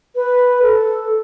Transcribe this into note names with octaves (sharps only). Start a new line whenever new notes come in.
B4
A4